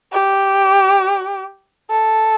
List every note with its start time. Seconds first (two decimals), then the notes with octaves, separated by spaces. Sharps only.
0.12 G4
1.90 A4